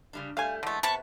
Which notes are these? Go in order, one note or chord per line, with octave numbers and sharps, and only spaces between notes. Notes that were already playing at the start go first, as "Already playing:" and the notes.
C#3 G3 D4
G3 A3 F5 G#5
D3 E3 G#3 A3
C3 B3 A5 B5 C#6